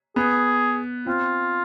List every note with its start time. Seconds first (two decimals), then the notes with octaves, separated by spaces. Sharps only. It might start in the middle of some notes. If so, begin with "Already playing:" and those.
0.16 B3 G#4
1.07 C4 F4